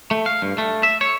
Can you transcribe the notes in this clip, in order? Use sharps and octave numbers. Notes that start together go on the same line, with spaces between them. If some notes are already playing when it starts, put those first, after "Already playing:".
A3
F5
G2
A3
E5
C#5